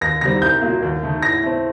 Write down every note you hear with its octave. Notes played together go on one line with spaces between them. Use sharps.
D#2 A#6
D#3 G3 C4 A#6
C2 G6
A#2 F#3 A#3
D#2
D#3 A3
A2 A#6
A3 C4